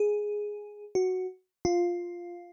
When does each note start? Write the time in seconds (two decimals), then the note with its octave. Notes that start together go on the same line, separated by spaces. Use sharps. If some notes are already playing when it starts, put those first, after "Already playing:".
Already playing: G#4
0.95 F#4
1.65 F4